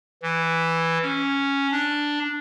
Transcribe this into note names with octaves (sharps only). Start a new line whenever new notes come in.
E3
C#4
D4